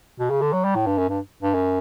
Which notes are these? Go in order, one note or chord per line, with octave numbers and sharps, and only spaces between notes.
B2
C#3
D3
F#3
G3
A2
G2
F#2
G2
G2
F#2